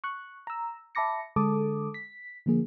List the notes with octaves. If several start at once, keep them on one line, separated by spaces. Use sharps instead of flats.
C#6 F#6
A#5 E6
E5 A5 B5 D6 A#6 C#7
D3 G#3 A4 A5 D6 D#6
B6
D3 F3 A#3 G#4